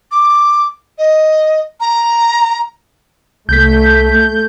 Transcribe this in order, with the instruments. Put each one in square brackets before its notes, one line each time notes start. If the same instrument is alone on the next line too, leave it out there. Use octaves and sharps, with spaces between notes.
[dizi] D6
D#5
A#5
[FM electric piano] C2 B6 [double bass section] A3 [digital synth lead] G6